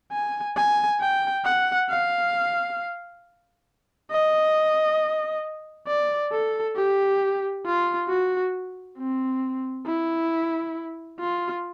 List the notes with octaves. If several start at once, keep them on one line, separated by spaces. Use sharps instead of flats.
G#5
G#5
G5
F#5
F5
D#5
D5
A4
G4
F4
F#4
C4
E4
F4